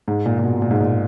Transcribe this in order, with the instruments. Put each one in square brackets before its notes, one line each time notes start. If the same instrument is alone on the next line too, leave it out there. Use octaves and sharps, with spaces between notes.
[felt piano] G#2
A#2
A#2
B2
A#2
G#2
A#2